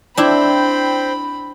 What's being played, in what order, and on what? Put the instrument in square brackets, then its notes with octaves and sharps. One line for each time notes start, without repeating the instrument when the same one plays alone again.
[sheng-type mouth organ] C4 C5 G5 [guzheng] D4 E4 [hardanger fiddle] B5